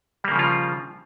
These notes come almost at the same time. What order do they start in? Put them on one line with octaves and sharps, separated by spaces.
G3 A#3 C#3 F3 F4